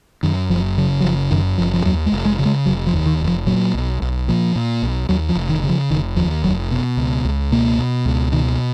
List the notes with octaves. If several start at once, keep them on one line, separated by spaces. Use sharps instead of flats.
F#2 D#3
F#1 F3
C#3 F#3
F#3
F#1 F3
F#2 D#3
F#1 F3
F3
D#2 F#3
G#3
F1
G#3
C#3
G#3
F1 F#3
F3
D#2
D#3
F1
F3
A#2 F#3
B1
B1
A#2 F3
A#2
B1
D#2 F#3
F3
F1
D#3
C#3
F3
F1 D#3
D#2 F3
F1 F#3
B2
C#2
C#2
B2 A#3
B2
C#2
B2 D#3